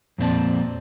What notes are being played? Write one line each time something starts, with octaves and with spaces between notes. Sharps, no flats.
F2 A#2 C4 D5 A5